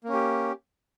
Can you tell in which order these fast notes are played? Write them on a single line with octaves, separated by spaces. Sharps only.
A#3 C#4 G4